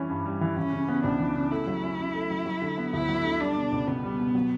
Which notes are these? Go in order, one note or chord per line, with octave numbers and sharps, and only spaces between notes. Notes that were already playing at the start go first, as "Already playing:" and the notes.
Already playing: E3 G3 C#4
G2
G3
E3
E3 C#4
C#3
B3
C#2 D4
E3
C#3
A3 E4
F#3
C#4
C#3
A3
F#3
F#3
D3
B3
D2 E4
F#3
D3
G3 D4
B2
C#2
C#2 B3
G3
B2
F#3